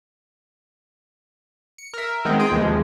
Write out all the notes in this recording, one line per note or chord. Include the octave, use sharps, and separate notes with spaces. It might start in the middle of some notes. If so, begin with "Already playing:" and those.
C#7
A#4 E5
D#3 G#3 B3 C4
F4 G#4 G5
D#2 C3 E3 F3 G#3